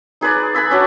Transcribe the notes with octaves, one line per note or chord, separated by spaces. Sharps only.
D#4 G#4 B4 D5
B4 G#5 B5 E6
C#4 D4 F#4